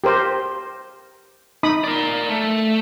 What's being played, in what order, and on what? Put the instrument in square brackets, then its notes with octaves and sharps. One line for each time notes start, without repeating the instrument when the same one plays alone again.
[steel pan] G4 A#4 C5
D#4 B5 D#6
[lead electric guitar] A#4 D5
A3